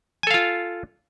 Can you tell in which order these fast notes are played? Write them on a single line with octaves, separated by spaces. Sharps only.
G#5 A4 F5 F4